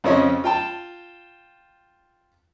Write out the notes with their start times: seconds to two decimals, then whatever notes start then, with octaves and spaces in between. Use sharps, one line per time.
0.04 F2 C#3 F3 C#4 C#5 D#5
0.44 F4 G5 A5